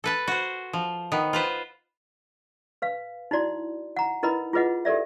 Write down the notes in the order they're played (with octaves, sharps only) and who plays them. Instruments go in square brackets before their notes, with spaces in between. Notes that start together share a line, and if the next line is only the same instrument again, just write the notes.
[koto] A4 B4 A5
F#4 C5
F3
D#3 B3
F4 B4 C5
[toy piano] B4 F5
D#4 E4 F#4 D5 C6
F#5 A#5
D#4 E4 A#4 B4 D#5 B5
F4 G#4 B4 D#5 F#5
G4 A4 A#4 D5 E5